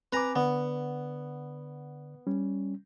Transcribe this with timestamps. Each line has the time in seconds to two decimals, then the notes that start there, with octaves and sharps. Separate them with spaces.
0.13 C4 B4 G#5 A#5 D6
0.36 D3 B3 D5 F#5
2.27 G3 C#4